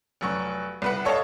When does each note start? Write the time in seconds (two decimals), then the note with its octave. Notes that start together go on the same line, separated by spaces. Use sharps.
0.21 F1 F#3 C#6
0.82 C2 B4 F#5
1.05 A4 C#5 D#5 F5 A5